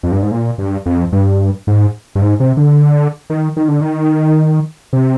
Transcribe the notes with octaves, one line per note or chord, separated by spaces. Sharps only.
F2
G2
G#2
A#2
G2
F2
G2
G#2
G2
G#2
C3
D3
D#3
D#3
D3
D#3
C3